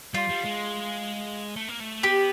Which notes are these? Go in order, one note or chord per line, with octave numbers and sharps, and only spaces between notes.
G3 F4
G3
G#3
A3
A#3
A3
B3 G4